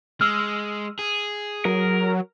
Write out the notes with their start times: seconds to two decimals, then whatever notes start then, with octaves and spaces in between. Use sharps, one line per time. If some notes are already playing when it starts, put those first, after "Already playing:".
0.21 G#3 E6 F6
0.99 G#4
1.65 F#3 A#4